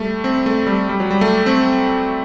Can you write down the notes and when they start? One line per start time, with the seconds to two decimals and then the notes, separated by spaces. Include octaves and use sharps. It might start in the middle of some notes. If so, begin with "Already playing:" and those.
Already playing: G3 A3
0.24 C4
0.46 A3
0.67 G3
0.89 G3
1.00 F#3
1.11 G3
1.21 A3
1.46 C4